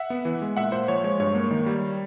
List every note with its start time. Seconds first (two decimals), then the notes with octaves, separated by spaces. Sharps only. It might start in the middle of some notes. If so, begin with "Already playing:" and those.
Already playing: E5 F#5
0.10 B3
0.25 E3
0.42 G#3
0.57 A#2 E5 F#5
0.72 A#2 C5
0.88 F3 C#5
1.04 G#3 C#5
1.20 G2 C#5
1.35 A#3
1.51 D#3
1.66 G3